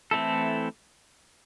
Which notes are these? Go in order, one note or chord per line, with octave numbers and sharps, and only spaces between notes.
E3 A3 C4 E4 A4